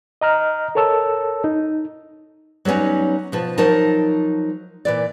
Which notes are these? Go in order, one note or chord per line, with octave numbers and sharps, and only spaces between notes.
D#5 A#5 F6
A4 A#4 C#5 A5 E6
D#4
F#3 G3 B3 C#4 D#4
B2 F3 A5
F3 F#3 D#4 F#4 A#4 A5
A#2 E3 D5